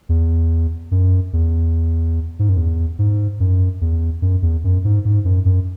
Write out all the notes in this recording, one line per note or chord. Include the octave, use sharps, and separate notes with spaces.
E2
F#2
E2
G#2
F#2
E2
G#2
F#2
E2
F#2
E2
F#2
G#2
G#2
F#2
F#2